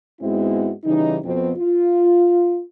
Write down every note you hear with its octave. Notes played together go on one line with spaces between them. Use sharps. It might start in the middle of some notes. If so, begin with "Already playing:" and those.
G#2 G#3 B3 C4 E4 F#4
C#3 E3 G3 D#4
F2 B2 C4
F4